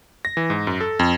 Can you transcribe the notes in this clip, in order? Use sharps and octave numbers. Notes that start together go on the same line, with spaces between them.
A#6
E3
G#2
F#2
A4
F2